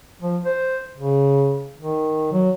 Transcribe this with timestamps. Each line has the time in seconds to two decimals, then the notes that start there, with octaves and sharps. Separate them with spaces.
0.21 F3
0.45 C5
0.97 C#3
1.78 D#3
2.33 F#3